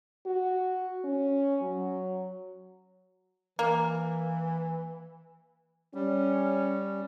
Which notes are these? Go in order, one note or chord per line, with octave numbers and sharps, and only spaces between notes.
F#4
C#4
F#3
E3 A#3
G3 C#4